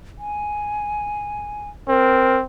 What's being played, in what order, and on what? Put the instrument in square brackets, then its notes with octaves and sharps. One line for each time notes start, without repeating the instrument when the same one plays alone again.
[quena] G#5
[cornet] C4 [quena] A#4